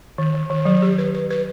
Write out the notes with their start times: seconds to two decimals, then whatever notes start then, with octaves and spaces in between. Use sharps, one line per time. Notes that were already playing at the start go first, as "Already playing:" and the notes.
0.18 D#3
0.34 D#3
0.50 D#3
0.65 F#3
0.82 G4
0.98 B4
1.14 B4
1.30 B4